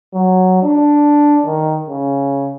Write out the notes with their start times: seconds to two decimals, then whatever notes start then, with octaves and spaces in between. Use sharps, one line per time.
0.14 F#3
0.63 D4
1.46 D#3
1.89 C#3